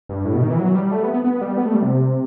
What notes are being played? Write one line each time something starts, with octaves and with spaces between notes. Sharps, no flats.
G2
A2
B2
D#3
E3
F#3
G3
A3
B3
B3
B3
G3
B3
A3
G3
C3